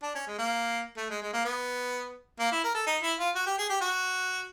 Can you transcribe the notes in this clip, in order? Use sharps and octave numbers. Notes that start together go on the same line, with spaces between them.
D4
C#4
G#3
A#3
A3
G#3
G#3
A#3
B3
A#3
E4
A#4
A4
D#4
E4
F4
F#4
G4
G#4
G4
F#4